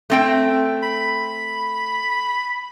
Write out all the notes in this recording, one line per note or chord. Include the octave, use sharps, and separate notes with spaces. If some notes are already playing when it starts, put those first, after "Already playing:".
A3 C4 G5
B5